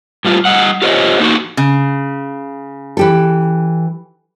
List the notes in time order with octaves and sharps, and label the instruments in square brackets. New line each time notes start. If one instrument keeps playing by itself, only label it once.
[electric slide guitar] A2 G3 F4
G3 D#5 F#5
F4 G4 A4 C5 C#5 D#5
A#3 D#4 F#4
[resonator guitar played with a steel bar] C#3
[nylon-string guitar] E3 G4 A4